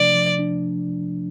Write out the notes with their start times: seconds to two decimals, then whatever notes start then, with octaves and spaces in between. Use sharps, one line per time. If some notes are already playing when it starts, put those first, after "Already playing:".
Already playing: C3 F3 A3 D4 D5
0.15 F3
0.39 D4